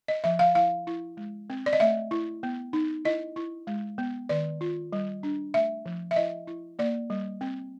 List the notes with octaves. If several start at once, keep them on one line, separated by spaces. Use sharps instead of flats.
D#5
F3 E5
F5
E4 F5
E4
G#3
C4
D5
D#5
A3 E5
E4
B3
D#4
E4 D#5
E4
G#3
B3
D#3 D5
F4
G3
D4
A3 E5
F3
E5
E4 D#5
E4
A#3 D5
G3
C4